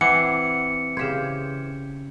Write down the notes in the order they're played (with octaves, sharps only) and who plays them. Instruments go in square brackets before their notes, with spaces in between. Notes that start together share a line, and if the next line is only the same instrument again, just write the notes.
[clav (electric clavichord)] E3 [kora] C4 [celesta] F#5 D6 C7 [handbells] C#7
[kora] C#3 G4 C5 [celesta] G#6 E7